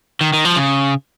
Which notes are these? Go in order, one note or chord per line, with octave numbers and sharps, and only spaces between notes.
D#3
D#3
F3
C#3